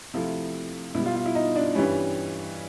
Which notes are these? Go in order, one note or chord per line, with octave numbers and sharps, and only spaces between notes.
C3 F3 A3 E4
B2 G3 E4
F4
F4
E4
D#4
D4
G2 E3 G3 C#4